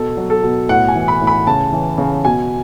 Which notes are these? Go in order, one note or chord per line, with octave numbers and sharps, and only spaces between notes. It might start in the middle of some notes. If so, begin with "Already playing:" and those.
Already playing: B2 A4
F#3
A4
B2
A2 F#5
G#5
E3
B5
A2
B5
C#3 A5
E3
C#3
B2 G#5